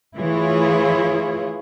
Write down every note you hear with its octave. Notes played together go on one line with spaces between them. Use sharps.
E3 A3 E4 F4 G#4 C#5